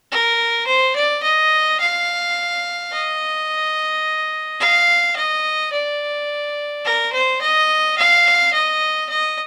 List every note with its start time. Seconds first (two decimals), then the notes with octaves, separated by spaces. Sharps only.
0.11 A#4
0.67 C5
0.96 D5
1.23 D#5
1.80 F5
2.92 D#5
4.60 F5
5.16 D#5
5.72 D5
6.85 A#4
7.12 C5
7.41 D#5
7.97 F5
8.53 D#5
9.09 D#5